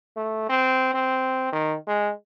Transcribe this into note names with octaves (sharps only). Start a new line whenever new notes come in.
A3
C4
C4
D#3
G#3